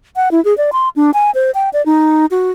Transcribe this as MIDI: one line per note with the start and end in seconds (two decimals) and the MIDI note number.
0.16 0.29 78
0.31 0.43 64
0.45 0.56 68
0.58 0.71 74
0.73 0.89 84
0.96 1.11 62
1.14 1.31 80
1.35 1.51 72
1.55 1.69 79
1.73 1.84 74
1.86 2.26 63
2.31 2.52 66